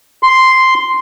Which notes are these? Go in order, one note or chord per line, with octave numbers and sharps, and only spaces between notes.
C6